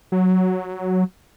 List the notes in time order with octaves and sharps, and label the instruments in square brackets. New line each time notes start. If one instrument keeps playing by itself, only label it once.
[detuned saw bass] F#3